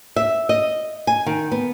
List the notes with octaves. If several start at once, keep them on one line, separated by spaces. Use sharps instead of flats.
E5
D#5
G#5
D#3
B3